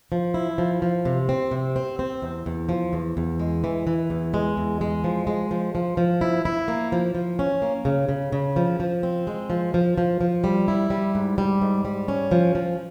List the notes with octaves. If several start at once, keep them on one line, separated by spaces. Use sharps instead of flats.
F3
E4
F3
F3
C3
C4
C3
C4
C4
E2
E2
F3
E2
E2
G#3
E3
E3
E2
G#3
E2
G#3
F3
G#3
F3
F3
F3
E4
E4
A#3
F3
F3
C#4
A#3
C#3
C#3
C#3
F3
F3
C4
G#3
F3
F3
F3
F3
G3
E4
G3
G#2
G3
G#2
G3
C#4
F3
F3